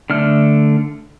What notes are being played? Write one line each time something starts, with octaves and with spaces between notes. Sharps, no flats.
D3 A3 F6